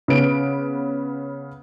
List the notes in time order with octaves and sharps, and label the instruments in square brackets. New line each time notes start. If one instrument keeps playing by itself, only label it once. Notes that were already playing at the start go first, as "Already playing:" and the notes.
[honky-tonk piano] C#3 B3 B4 D7